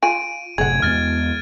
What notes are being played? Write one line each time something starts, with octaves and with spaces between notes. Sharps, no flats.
F4 G#5 D7 D#7
F#1 A2 C3 G#4 F#5 G#6
E2 G#3 B3 F6 A6